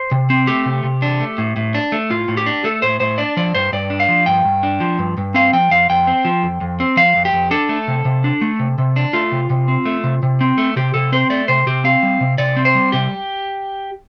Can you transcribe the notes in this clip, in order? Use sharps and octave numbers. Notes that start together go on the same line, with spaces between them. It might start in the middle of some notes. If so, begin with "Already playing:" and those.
Already playing: C5
C3
C4
A3 G4
C3
C3
D4
A3
A2
A2
D4
A3
A2 F4
A2
G4
D4
A3 A4
A2 C5
A2 C5
D4 D5
F3 D5
G2 C5
G2 D5
D4
F5
F3
G2 G5
G2
D4
F3
G2
G2
C4 F5
F3 G5
F2 F5
F2 G5
C4
F3
F2
F2
C4
F3 F5
F2
G4
F2
D4 A4
A3
C3
C3
D4
A3
C3
C3
D4
A3 F4
C3
C3
C4
A3
C3
C3
C4
A3
C3 G4
C3 A4
C4 C5
A3 D5
C3 C5
C3 G4
C4 F5
G3
C3
C3 D5
C4
C5
G3
C3 G4